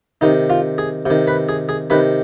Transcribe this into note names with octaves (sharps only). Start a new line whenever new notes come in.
C3 D#3 D#4
F4
G#4
C3 D#3
B4
G#4
G#4
C3 D#3 B4